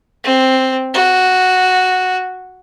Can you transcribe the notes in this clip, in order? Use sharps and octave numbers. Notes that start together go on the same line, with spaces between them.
C4
F#4